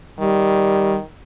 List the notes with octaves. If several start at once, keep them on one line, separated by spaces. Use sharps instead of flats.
D#3 G3